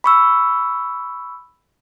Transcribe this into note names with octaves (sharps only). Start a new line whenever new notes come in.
B5 C#6 E6